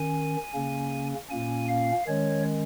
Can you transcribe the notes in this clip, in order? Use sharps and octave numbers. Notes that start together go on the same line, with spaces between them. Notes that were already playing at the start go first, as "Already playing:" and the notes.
Already playing: D#3 C#4 G#5
C#3 A#3 C#4
A#2 A#3 C#4 G#5
F5
D#3 G#3 C#4 C#5